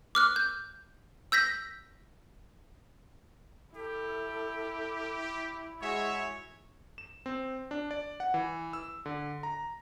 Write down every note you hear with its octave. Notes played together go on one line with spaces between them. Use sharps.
D6 F6 F#6
G6
E6 G6 A#6 B6
E4 G4 A4
G#3 F#4 G#4 C#5 E5
E7
C4
D4
D5
F#5
E3
E6
D3
A#5